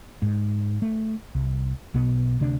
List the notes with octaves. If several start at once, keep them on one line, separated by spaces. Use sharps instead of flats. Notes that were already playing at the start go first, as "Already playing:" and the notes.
G#2
A3
C2
B1 B2 B3
D2 C3 D4